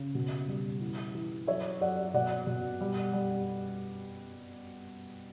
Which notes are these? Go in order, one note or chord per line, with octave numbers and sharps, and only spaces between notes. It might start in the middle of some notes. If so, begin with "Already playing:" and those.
Already playing: C#3
B2
G3
E3
E3
F#3 C#5 E5
F#3 D5 F#5
B2 D5 F#5
B2
G3
G3